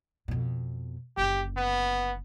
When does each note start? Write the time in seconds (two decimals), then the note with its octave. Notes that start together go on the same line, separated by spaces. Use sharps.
0.28 F2 B2
1.17 F#1 D3 G4
1.57 B3